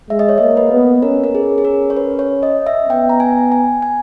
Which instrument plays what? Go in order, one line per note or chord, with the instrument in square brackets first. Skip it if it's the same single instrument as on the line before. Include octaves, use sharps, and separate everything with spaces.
[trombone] G#3 [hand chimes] E5
[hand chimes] D#5
C#5
[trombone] A#3 [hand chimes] D#5
[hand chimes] B4
[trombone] B3
[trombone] C#4 [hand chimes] A#4
[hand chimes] A#4
G#4
G#4
A#4
C#5
B4
C#5
D#5
E5
[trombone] B3 [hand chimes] G5
[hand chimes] A#5
G#5
G#5
G#5